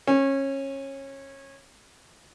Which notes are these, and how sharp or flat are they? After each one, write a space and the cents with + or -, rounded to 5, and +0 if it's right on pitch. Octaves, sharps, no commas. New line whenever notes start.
C#4 -25